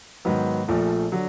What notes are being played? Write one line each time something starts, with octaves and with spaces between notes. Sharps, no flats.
G#2 D#3 F#3 B3
A#1 A#2 F3 A3
D3 F#3